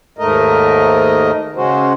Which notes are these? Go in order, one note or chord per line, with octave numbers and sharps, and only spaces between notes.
D#2 G#2 A3 A#4 D#5
C#3 G#3 C#4 F#4 C5